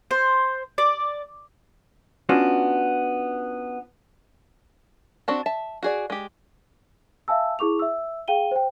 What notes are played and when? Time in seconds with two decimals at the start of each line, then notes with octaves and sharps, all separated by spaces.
0.11 C5
0.78 D5
2.29 B3 C#4 D4 F4 F#4
5.28 C4 D4 F#4 A5
5.46 E5 A5
5.83 F#4 G#4 D5
6.10 G#3 G4
7.28 E5 F5 G#5 A5 E6
7.59 E4 G#4 C#6 D6 F7
7.79 E5 E6
8.28 G#4 F5 G5 D#7 G7
8.51 C5 G5